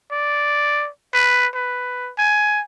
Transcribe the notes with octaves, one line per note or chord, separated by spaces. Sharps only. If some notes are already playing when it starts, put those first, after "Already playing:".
D5
B4
B4
G#5